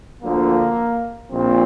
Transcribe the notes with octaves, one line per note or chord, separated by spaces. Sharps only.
D2 D3 F3 A#3
A#1 A#2 F3 C4